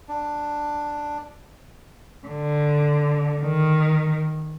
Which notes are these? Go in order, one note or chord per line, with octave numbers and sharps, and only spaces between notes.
D4
D3
D#3